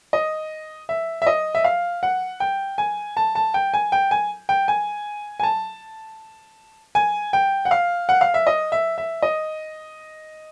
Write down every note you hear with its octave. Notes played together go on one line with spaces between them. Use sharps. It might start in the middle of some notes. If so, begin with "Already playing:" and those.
D#5
E5
E5
D#5
E5
F5
F#5
G5
G#5
A5
A5
G5
G#5
G5
G#5
G5
G#5
G#5
A5
G#5
G5
F#5
F5
F#5
F5
E5
D#5
E5
E5
D#5